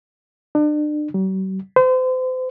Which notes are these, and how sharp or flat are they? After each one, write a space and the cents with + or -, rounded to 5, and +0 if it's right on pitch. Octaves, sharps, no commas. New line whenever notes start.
D4 +35
F#3 +45
C5 -35